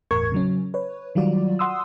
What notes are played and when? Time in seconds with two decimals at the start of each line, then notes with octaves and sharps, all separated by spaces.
0.11 G1 E2 A2 A#4 C#6 G#6
0.32 C#3 F#3 C#4
0.74 B4 C#5
1.15 D#3 F#3 G3 F4 F#4 D5
1.59 F#5 C6 D#6 E6